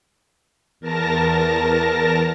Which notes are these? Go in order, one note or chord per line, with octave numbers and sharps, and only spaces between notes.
E2 A#4 A5 A#6